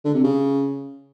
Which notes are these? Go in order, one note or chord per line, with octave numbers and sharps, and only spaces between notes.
D3
C3
C#3